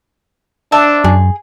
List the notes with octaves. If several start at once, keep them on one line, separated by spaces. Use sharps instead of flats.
D4 C5 E5 A5
F#2 G#4